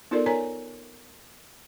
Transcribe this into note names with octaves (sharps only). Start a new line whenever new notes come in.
B3 D#4 F4 A4 A#4 D5
A#4 C#5 G#5 A#5